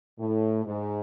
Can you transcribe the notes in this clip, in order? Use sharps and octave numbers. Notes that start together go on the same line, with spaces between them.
A2
G#2